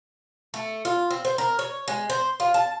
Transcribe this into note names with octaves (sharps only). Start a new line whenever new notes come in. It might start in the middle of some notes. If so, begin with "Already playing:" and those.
A3
F4
C4
C5
A#4
C#5
G#3
C5
F4
A5